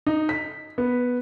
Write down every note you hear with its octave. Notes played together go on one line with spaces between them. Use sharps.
D#4
B6
B3